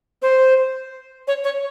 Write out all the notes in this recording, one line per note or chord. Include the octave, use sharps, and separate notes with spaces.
C5
C#5
C#5